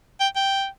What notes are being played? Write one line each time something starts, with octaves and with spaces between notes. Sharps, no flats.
G5
G5